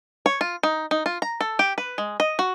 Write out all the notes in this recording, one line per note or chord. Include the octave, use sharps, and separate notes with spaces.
C#5
F4
D#4
D#4
F4
A#5
A4
G4
B4
G#3
D#5
F#4